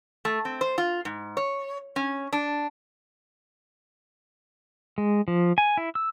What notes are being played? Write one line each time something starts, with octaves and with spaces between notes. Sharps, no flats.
A3
C4
C5
F4
G#2
C#5
C#4
D4
G#3
F3
G#5
E4
E6